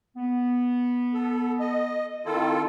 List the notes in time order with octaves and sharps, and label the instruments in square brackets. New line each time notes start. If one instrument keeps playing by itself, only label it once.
[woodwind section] B3
[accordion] A4
D#5
[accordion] D#3 F4 A4 [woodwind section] C4 E4